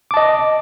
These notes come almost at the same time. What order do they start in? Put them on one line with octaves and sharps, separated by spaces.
D6 A5 D#5